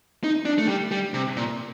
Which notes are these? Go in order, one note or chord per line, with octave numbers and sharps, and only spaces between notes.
D#4
D4
A3
G3
G3
C3
A#2